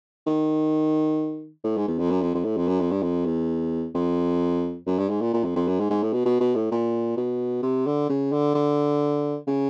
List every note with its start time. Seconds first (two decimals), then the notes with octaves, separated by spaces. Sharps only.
0.27 D#3
1.64 A2
1.77 G#2
1.88 E2
1.99 F2
2.11 F#2
2.22 F2
2.34 F2
2.45 A2
2.57 F2
2.68 F#2
2.80 F2
2.91 G2
3.02 F2
3.25 E2
3.95 F2
4.87 F#2
4.99 G2
5.09 G#2
5.21 A#2
5.34 A#2
5.44 F2
5.56 F2
5.68 F#2
5.80 G#2
5.90 G#2
6.03 A2
6.13 B2
6.25 B2
6.40 B2
6.56 A2
6.71 A#2
7.17 B2
7.63 C3
7.86 D3
8.10 C#3
8.32 D3
8.55 D3
9.47 C#3